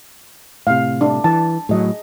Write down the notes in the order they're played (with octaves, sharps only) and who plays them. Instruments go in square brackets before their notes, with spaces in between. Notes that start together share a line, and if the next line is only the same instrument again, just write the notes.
[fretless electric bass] A2 C3 [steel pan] F5
[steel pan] D4
[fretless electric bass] E3 [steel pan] A5
[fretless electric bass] A2 F#3 [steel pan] G#4 D#5